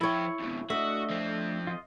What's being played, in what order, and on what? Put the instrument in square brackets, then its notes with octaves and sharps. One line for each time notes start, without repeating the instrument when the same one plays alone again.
[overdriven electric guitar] F3 G5 [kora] E4 C#5
[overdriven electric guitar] F2 B2
[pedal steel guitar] A3 D4 D#5 [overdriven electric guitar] F#4 [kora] E5
[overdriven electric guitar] F3 C4
[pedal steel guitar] F4 D#5